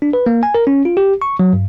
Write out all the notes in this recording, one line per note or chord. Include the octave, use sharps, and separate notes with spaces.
D4
B4
A#3
G#5
A#4
C#4
F4
G4
C#6
F#3
G2